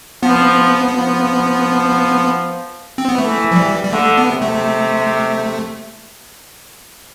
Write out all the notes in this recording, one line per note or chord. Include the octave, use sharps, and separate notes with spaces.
F3 B3
F3
C4
B3
E3 A3
F3
G3
G3
D3 A3
B3
C3
A3